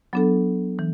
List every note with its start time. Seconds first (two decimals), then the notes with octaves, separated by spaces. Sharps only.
0.13 F#3 B3 D4 A4
0.79 E3